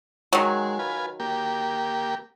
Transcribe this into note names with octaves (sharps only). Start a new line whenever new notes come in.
D#3 F#3 G#3
F4 B4 G#5
A#3 G4